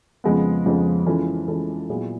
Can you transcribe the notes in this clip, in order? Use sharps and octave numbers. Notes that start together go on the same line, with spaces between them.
F2 C#3 F3 G#3 B3
F2 C#3 F3 G#3 B3
E3 G#3 C#4 F4 A4
E3 G#3 C#4 F4 A4
A#2 F#3 B3 E4 G#4